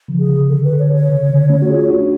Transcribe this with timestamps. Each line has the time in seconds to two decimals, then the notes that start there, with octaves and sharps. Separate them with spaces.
0.08 C#3 F3
0.19 G#4
0.29 C#3
0.49 D3 A4
0.64 D3 B4
0.79 C#5
0.89 D3 C#5
1.09 C#3
1.29 D3
1.49 A3 C#4
1.62 F#4
1.70 F4 G#4
1.89 D4 F#4